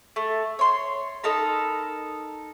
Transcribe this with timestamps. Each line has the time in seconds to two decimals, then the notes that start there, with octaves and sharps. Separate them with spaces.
0.16 A3
0.59 C#5 C6
1.24 D#4 A4 A#4 B5